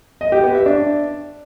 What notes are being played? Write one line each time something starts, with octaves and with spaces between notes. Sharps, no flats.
D#5
G4
B3
E5
D4